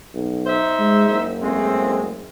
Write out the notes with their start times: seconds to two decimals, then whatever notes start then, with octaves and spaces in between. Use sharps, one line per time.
0.14 B1
0.47 D#4 C5 E5
0.79 G#3
1.09 F#1
1.41 G#3 A3 C4